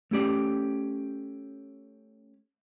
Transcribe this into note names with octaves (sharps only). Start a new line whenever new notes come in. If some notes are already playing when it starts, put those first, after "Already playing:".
A3 C#4 G4 D5